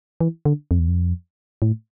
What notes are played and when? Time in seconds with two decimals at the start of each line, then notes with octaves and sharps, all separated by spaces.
0.21 E3
0.45 D3
0.71 F2
0.79 E2
0.88 F2
1.62 A2